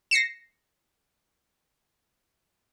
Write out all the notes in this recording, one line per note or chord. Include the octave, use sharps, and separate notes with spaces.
A#6 C7 C#7 E7